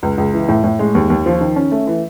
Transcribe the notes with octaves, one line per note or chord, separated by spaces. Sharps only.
C#2
C#2
E3
A2
A2
G#3
D#2
D#2
F3
D#3
C#4
A3
E3